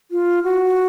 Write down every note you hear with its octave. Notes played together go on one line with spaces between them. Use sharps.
F4
F#4